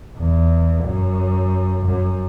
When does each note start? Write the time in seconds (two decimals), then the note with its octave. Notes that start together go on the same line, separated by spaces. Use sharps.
0.17 E2
0.84 F#2
1.85 F#2